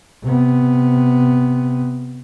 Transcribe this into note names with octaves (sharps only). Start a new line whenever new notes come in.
C3 B3